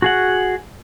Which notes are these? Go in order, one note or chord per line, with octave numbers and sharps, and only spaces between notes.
F#4 G#4 F#5